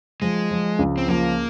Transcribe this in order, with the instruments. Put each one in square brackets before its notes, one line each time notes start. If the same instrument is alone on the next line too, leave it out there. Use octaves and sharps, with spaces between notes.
[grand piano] F3 [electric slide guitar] G#3
[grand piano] F3
C#2
[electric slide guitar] C4
[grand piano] F3 [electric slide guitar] A#3